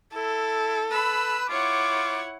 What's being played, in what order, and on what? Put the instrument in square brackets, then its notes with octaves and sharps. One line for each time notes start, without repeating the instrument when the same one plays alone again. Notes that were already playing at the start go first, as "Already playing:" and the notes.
[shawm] E4 [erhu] A4
[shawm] B4 [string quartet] B5 E6
[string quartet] E4 C#5 F#5 [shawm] F4 [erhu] D6